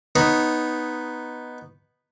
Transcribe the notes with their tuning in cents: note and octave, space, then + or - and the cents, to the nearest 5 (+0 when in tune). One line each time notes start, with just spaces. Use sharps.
B3 +0 D#4 +0 C#5 -20